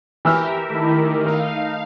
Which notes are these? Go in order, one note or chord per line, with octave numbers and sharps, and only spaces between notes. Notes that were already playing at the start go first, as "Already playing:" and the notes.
E3 G4 A#4 E5 E6 F6
D#3 A3 E4
D#4 A#4 F5